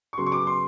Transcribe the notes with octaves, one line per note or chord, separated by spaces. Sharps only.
C#6
C#3 F#3 B3 C6
C#6
D6
C6